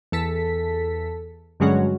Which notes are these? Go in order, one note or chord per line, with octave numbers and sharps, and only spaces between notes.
E2 A4 B6
G2 D3 F#3 G#3 C#4 F#4